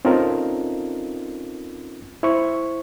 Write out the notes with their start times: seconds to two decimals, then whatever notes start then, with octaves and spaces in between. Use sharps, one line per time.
0.05 C4 C#4 D#4 F4 A4 A#4
2.23 E4 C5 C#6